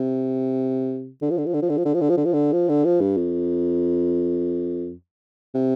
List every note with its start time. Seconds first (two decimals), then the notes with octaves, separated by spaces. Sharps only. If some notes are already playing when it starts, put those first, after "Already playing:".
Already playing: C3
1.22 D3
1.30 F3
1.38 D3
1.46 F3
1.54 D3
1.62 F3
1.70 D3
1.77 F3
1.85 D3
1.94 F3
2.01 D3
2.09 F3
2.17 D3
2.25 F3
2.33 D3
2.53 F3
2.69 D3
2.85 F3
3.01 G2
3.17 F2
5.55 C3